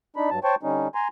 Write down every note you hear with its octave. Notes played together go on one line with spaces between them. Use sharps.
D4 D#4 B5
G2 F#3 A5
C5 C#5 G5 A5 C#6
D3 G3 C#4 D#4
G#5 A#5 C6